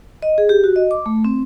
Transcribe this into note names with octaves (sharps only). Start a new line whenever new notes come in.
D#5
G#4
G4
F#4
D#5
D6
A3
C4